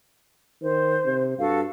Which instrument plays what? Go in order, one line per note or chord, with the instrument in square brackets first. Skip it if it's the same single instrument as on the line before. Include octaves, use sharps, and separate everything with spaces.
[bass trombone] D#3 [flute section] C5
[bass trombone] C3
[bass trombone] G2 [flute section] F#4 A4 F5